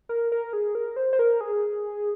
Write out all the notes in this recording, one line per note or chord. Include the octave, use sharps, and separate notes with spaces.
A#4
A#4
G#4
A#4
C5
C5
A#4
G#4